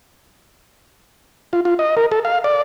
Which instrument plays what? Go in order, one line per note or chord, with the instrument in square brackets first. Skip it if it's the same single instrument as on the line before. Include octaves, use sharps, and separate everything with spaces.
[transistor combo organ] F4
F4
D#5
A#4
A4
F5
D5